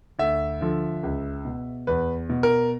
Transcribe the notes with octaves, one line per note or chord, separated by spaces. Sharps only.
D2 E5
D3 F3
C#2
B2
E2 B4
B2
A#4